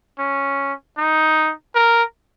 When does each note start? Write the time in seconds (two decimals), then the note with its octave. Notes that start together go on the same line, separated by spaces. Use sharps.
0.19 C#4
0.98 D#4
1.75 A#4